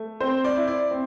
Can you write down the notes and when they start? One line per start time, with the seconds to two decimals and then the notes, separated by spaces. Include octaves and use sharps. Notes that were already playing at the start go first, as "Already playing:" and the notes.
Already playing: A3
0.20 C4 C5
0.44 D5
0.56 E4
0.68 D5
0.91 C4